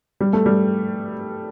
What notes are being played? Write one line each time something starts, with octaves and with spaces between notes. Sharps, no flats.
G3
A3
G3